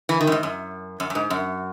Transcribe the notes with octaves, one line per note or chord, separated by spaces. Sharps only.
E3
D#3
F#2
G#2
F#2
F#2
F#2
G#2
F#2